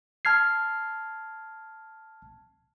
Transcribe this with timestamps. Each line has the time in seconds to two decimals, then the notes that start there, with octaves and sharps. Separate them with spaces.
0.25 A5 F6 G#6 C7